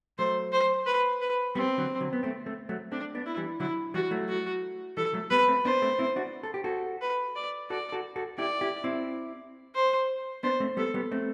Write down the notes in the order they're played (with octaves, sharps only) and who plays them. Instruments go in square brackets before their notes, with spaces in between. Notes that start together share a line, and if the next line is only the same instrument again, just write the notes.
[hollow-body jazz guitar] F#3 A3 [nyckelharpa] C5
[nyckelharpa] C5
B4
B4
[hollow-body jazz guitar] G3 B3 [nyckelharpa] C4
[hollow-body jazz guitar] D3 F#3
D3 F#3
B3
A3 C4
A3 C4
F#3 A3
[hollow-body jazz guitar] A3 C4 [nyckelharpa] D4
[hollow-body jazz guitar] B3 D4
[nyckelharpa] E4
[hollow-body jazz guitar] E3 G3
[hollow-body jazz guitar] D3 F#3 [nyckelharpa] E4
[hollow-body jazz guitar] E3 G3 [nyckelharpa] F#4
[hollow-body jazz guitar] F#3 A3
[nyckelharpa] F#4
[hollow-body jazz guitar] E3 G3 [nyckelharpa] A4
[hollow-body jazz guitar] F#3 A3
[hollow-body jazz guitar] G3 B3 [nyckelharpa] B4
[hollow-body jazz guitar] A3 C4
[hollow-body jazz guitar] B3 D4 [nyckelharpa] C5
[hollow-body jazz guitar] A3 C4
C4 E4
D4 F#4
A4
G4
F#4 A4
[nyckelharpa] B4
D5
[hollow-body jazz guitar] F#4 A4 [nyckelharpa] D5
[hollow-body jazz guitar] F#4 A4
F#4 A4
[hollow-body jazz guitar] E4 G4 [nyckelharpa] D5
[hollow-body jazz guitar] E4 G4
C4 E4
[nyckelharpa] C5
[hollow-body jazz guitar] B3 D4 [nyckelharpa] C5
[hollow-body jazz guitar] A3 C4
[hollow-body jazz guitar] G3 B3 [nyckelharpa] A4
[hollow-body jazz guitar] G3 B3
A3 C4